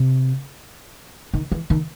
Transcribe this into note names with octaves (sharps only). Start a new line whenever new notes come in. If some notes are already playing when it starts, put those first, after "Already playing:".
Already playing: C3
D#3
E3
D#3